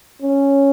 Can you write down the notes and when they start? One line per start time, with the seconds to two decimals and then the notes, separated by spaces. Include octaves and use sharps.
0.22 C#4